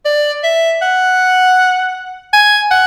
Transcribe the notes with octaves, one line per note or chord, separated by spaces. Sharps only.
D5
E5
F#5
G#5
F#5